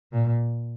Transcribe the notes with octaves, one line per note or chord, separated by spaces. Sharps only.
A#2